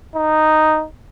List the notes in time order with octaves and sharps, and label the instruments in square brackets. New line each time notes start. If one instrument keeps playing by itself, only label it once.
[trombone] D#4